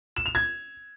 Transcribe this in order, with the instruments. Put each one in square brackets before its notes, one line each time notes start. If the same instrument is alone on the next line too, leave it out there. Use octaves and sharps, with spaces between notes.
[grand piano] E7
F7
G#6